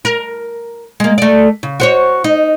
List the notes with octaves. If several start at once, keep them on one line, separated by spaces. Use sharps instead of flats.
A#4
G#3 A#3
A3 D5
C#3
F#4 C5 C#5
D#4